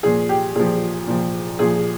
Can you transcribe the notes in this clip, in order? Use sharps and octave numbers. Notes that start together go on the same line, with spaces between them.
A#2 F3 G#4
G4
A#2 F3 G#4
A#2 F3
A#2 F3 G#4